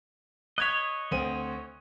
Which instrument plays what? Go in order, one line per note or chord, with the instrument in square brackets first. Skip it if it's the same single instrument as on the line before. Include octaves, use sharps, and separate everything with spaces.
[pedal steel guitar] C#5 D#5 [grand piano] F#6 G#6 B6
[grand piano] D2 C4 D#7